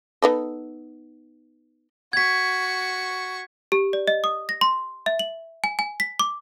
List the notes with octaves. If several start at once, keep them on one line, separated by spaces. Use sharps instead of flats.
B3 D#4 A4
F#4 C#6 G#6 B6
G4
D5
D#5
D#6
A#6
C6
E5
F#7
G#5
G#5
B6
D6